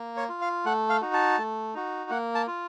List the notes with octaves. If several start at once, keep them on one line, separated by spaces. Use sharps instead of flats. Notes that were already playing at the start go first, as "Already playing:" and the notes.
Already playing: A#3
C#5
F4
F5
A3 F#5
F5
D#4 F#4
A5
A3
D#4 F#4
A#3 F#5
A5
F4